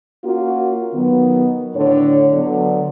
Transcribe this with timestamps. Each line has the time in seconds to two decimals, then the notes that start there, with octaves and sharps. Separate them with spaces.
0.23 A#3 C#4 F4 F#4
0.94 D#3 F#3 B3
1.75 A2 D3 D4 C#5
2.32 D3 F#3 B3